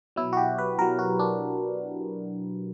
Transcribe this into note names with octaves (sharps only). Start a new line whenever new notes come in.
B2 F#3 E4
F#4
G4
B4
B2 F#3 A#4
F#4
D4